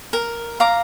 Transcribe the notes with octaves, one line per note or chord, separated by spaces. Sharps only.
A#4
F5 A#5 D6